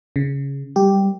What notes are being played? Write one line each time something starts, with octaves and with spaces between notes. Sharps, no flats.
C#3
G3 G4